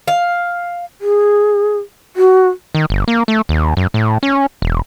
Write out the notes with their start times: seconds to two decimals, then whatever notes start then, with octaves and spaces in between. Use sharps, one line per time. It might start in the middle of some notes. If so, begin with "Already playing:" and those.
0.08 F5
1.00 G#4
2.16 F#4
2.75 D#3
2.90 G1
3.08 A#3
3.28 A3
3.49 D#2
3.77 F#2
3.94 A2
4.23 C#4
4.62 E1